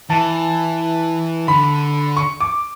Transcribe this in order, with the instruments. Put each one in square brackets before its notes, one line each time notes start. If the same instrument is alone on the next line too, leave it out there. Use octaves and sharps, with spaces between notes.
[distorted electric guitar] E3 [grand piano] A5
[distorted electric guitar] D3 [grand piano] B5
[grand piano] C#6
D6